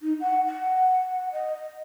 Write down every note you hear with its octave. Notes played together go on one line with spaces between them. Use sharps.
D#4
F#5
F#5
D#5